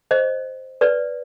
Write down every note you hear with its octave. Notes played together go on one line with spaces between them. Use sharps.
C5 D#5
B4 D5